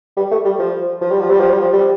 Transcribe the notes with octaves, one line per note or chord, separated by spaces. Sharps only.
G3
A3
G3
F3
F3
G3
F3
G3
F3
G3
F3
G3